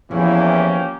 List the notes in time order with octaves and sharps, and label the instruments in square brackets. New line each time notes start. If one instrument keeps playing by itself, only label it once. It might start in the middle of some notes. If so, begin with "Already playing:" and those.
[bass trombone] E2 [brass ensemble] E3 [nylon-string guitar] F3 [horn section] A#3 C#4 G4